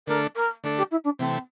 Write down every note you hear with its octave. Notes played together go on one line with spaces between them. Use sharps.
D3 A3 D4 A4 A#4
A#4
D3 A3 D4 A4
G4
E4
D4
C3 E3 A3 C4